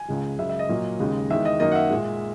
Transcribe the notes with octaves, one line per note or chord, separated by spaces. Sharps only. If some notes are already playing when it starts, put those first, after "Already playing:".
Already playing: G#5
C#2 C#3 G#3
F#2 C#3 G#3 E5
E5
D#5
A#2 F#3 A#3
D#2 C#3 G#3
E2 D#3 G#3 E5
D#5
F#2 D#3 A#3 D#5
F#5
E5
A#2 G#3